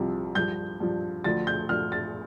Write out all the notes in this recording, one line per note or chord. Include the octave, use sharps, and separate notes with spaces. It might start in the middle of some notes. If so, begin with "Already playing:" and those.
Already playing: C2 C3 F3
G2 F3 G6
G2 F3
D2 D3 F3 A6
G6
D2 D3 F3 F6
A6